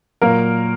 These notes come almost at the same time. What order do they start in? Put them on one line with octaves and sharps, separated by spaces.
F#3 A#3 A#4 A#2